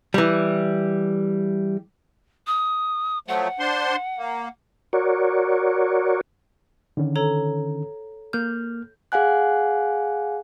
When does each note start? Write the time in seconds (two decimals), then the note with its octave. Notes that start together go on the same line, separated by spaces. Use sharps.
0.14 E3 G3
2.47 D#6
3.28 F3 F#3 A3 F#5
3.60 D4 C5 C6
4.18 A#3
4.93 F#4 A#4 C#5 D5
6.97 D3 D#3 C#4
7.16 A4 C#5 A#5
8.33 A#3 F6 G6
9.12 G#4 F5 F#5 G#5 F#6